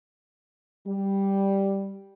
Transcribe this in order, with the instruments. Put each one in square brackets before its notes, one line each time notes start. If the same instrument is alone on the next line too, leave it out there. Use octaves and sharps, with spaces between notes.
[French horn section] G3